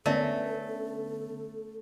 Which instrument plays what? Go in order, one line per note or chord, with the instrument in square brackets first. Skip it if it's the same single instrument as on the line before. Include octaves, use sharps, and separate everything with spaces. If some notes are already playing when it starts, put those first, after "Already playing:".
[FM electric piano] D3 B3 C#4 [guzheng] A3 [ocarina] A4 [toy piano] A#4 D5 E5